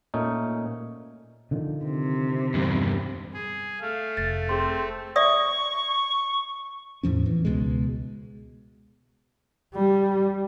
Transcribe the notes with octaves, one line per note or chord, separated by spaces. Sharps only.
A#2 A3 C#4 D#4
D3 D#3 F3
C3
E2 G2
G#4
A3 F5
F1 A6
C4 G#4 C6
D5 E5 C#6 D#6
E2 A2 F3 C#4
E3
C#2 B2 G#3
G3